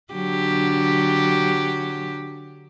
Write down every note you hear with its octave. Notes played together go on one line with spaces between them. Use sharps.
D3 F#3 G4